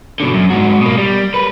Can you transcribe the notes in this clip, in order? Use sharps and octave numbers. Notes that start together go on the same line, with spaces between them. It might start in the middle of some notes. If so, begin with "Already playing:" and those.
B2 D3
F#2
G#2 F#4
B2 A#3
G3
A#4 B4